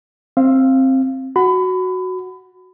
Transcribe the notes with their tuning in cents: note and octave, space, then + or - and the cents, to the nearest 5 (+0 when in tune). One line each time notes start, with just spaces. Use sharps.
C4 +15 F5 -10
F#4 +0 B5 +30